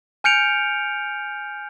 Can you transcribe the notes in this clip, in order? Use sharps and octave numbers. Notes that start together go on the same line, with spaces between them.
G#5 F6 G6 C#7 D7 F7